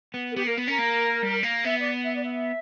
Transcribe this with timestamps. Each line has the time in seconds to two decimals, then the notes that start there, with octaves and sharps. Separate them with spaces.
0.14 B3
0.31 A#4
0.35 B3 G4
0.46 A#3 A#4
0.58 B3
0.68 C#4 A#4
0.79 A#3
1.22 G3
1.43 A#3
1.65 B3 E5
1.80 D5
2.04 E5
2.14 D5
2.24 E5